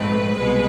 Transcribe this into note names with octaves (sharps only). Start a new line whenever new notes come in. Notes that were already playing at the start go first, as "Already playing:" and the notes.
Already playing: A#1 G#2 F3 A3 C4 B4
C2 B2 G#3